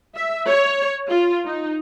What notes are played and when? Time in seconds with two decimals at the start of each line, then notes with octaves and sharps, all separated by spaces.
0.16 E5
0.48 C#5
1.09 F4
1.46 D#4